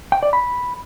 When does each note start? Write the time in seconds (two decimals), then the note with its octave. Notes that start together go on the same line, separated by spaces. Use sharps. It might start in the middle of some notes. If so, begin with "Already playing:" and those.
0.12 G5
0.23 D5
0.33 B5